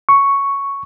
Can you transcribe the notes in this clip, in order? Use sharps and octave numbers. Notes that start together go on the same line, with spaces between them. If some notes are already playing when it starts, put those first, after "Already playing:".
C#6